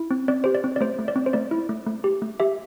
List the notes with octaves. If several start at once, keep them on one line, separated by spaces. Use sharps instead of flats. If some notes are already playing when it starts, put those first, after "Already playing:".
Already playing: E4
C4
C4 D5
G4 C5
D5
C4
D5
A3 C5
A3
D5
C4
C5
A3 D5
E4
A3
A3
G4
A3
G4 E5